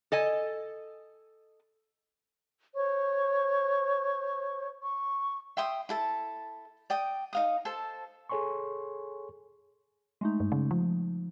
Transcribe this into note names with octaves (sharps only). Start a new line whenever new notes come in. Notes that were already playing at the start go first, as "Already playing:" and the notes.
A4 D#5 G#5
C5 C#5 C#6
C#6
E5 G5 C6 D#6
E4 A4 A5
D5 G5 D#6
D#4 F5 D#6
A4 C5 A5
G#4 A4 C#5 G#5 C6 C#6
G#3 A3 D#4
G2
C#3
F3